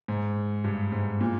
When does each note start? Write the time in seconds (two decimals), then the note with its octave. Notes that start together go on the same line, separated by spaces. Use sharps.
0.08 G#2
0.64 G2
0.92 G#2
1.21 A#2